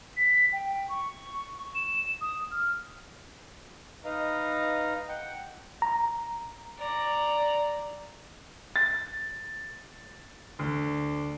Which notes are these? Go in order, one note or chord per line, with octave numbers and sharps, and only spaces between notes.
B6
G5
C#6
E7
D#6
F6
D#4 B4 D#5 F5 A#5
F#5 G5
A#5
D5 A#5
A6
D2